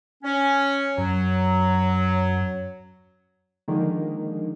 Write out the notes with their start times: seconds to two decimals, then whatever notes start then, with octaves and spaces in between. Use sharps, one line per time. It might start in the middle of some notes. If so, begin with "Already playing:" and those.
0.23 C#4
0.98 F#2 F#3
3.68 D3 D#3 F3 G#3 A#3